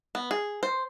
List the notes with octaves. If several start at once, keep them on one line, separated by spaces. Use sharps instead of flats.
B3
G#4
C5